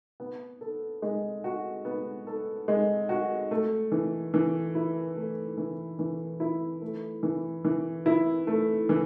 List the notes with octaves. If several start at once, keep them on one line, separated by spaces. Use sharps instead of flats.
B3
A4
G#3
F#4
B3
A4
G#3
F#4
A3
E3
E3
E4
A3
E3
E3
E4
A3
E3
E3
E4
A3
E3